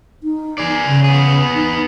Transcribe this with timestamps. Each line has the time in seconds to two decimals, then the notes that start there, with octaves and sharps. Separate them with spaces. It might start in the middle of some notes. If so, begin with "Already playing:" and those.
0.23 D#4
0.58 G#4 D5
0.86 C#3
1.04 B3 G#4
1.55 D#4